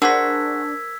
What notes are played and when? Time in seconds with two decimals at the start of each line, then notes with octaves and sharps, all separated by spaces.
0.02 D4 F#4 G#4 A#4 C5 E6 G#6 B6